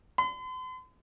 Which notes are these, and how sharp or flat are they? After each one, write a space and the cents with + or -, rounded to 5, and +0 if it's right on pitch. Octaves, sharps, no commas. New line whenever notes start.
C6 -45